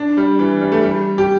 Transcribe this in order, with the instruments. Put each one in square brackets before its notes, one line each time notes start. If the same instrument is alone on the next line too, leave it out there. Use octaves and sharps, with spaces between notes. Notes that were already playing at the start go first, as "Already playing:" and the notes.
Already playing: [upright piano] D4
G3
E3
G3
A3
G3
G4